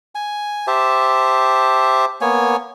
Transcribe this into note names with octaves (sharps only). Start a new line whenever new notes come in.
G#5
G4 C5 E5 A5
A#3 B3 C#5 G#5